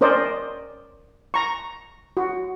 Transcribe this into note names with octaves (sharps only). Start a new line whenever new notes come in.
C#4 A#4 C5 D5 D#5
A#5 C#6
F#4